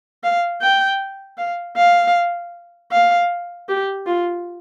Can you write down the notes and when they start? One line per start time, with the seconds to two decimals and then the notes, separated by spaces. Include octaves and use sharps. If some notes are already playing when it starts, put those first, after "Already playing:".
0.24 F5
0.61 G5
1.38 F5
1.77 F5
2.91 F5
3.69 G4
4.07 F4